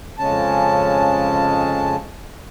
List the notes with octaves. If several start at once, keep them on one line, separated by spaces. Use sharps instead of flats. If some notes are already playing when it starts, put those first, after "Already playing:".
F2 C#3 G#3 C#4 A5